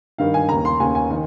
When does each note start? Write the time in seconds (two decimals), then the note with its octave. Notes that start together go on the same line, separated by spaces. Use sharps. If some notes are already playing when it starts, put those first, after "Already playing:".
0.18 G2 D#3 F5
0.34 G#5
0.49 D#2 C#3 A#5
0.65 C6
0.80 D#2 C#3 G#5
0.95 G#5
1.10 D#3